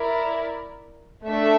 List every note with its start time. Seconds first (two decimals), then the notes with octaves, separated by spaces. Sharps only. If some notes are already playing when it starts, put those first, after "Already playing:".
Already playing: E4 A#4 D5
1.25 A3 D4 A4 E5